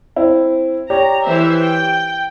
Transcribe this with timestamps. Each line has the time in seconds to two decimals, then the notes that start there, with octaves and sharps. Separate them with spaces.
0.16 C4 E4
0.90 G4 C#5 D5 A#5
1.24 E3 C5 E5
1.59 G5